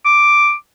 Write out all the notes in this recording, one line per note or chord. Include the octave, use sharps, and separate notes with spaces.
D6